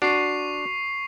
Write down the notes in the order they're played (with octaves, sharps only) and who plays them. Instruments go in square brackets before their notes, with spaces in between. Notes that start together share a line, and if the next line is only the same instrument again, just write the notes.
[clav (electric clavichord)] D4 [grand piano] F#4 [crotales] C#6 C7 F7